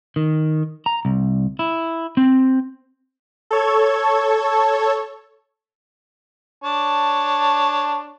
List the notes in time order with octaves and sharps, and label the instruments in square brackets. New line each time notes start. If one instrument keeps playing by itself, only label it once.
[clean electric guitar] D#3
A#5
C2
E4
C4
[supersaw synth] A4 C#5 G#6
[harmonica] D4 C#5 A5